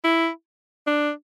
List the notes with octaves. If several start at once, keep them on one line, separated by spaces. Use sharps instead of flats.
E4
D4